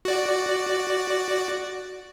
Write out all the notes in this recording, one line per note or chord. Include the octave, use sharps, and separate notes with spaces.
F#4 D5